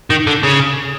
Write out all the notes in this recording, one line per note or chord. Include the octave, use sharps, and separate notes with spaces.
D#3
D3
C#3